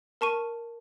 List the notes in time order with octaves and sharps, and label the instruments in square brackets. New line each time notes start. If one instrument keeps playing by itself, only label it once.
[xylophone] A#4 A5 C#6 D#7